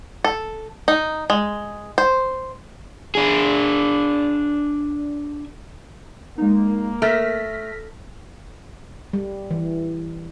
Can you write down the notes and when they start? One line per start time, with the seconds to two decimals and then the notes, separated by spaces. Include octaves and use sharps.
0.24 A4
0.88 D#4
1.30 G#3
1.98 C5
3.15 D4 G#4
6.38 G#3 A#3 D#4
7.02 A3 F6 A#6 B6
9.13 G3
9.51 E3